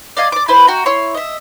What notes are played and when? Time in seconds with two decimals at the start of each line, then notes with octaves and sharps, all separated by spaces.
0.17 D5 D#5 F5 G#5
0.32 D5 D6
0.48 E4 B4 C5
0.67 F#4 G5 A#5
0.86 E4 C#5 C6
1.14 D#5 E5